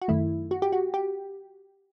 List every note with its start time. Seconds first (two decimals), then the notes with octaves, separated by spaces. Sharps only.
0.02 F#4
0.08 F#2 D#3 A3 E4
0.51 F#4
0.62 G4
0.72 F#4
0.94 G4